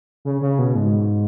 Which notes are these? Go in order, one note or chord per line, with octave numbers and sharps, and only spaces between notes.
C#3
C#3
B2
G#2